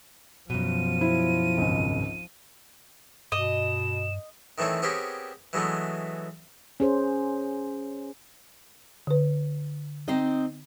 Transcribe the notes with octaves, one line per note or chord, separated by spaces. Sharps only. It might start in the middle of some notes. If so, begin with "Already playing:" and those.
F#2 B2 F3 D#7
E4 C5
G#1 C#2
G2 B2 D#5 E7
D#3 E3 A3 C4 C#5
B3 C4 G4 G#4 A#4 C#5
E3 F#3 G#3 A3 B3
C#4 G#4 C5
D3 B4
C4 D#4 D#5